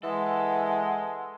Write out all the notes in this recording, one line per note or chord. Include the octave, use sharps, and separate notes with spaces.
E3 G#3 A4 F#5